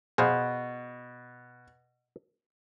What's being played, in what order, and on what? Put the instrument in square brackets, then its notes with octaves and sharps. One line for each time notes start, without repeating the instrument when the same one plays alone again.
[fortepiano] B2 [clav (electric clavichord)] G#4 C5 F5